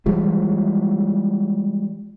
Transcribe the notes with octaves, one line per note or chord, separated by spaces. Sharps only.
E3 F3 G3 G#3